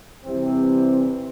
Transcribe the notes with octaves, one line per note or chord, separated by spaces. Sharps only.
C3 E3 G3 C4